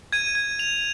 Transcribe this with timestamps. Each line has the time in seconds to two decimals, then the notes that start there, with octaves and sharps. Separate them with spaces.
0.12 G#6 D#7
0.35 G#6
0.59 F7